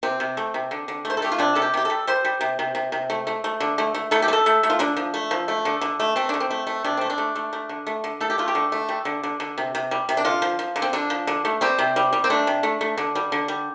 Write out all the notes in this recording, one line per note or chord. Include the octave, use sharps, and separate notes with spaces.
C3 C4
C3
A3
C3
D3
D3
A3 C5
A4
A3 G4
F4
C3 D4
C3 A4
G4
C3 G4
G3 A4
G3 C5
G3
C3
C3
C3
C3
A3
A3
A3
D3
A3
A3
A3 A4
G4
A3
A4
A3
A3
F4
D3 D4
F3
A3
F3
A3
D3
D3
A3
A3 C4
D3 D4
C4
A3
A3
C3 D4
A3 C4
D4
A3
A3
A3
D3
A3
D3
A3 A4
G4
A3 F4
G4
D3
A3
G3
D3
D3
D3
C3
C3
G3
C3
D4
D3 F4
F3
F3
D3
C4
D3 D4
F3
D3
A3
G3 C4
C3
G3
G3
C4
A3 D4
C3
A3
A3
D3
G3
D3
G3